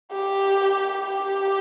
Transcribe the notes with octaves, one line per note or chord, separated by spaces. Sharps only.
G4
G4